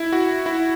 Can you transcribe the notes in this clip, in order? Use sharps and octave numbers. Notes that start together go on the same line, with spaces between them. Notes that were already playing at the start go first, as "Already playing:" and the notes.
Already playing: E4
F#4
E4